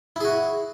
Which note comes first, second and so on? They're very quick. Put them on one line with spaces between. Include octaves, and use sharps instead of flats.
E4 G#4 F#4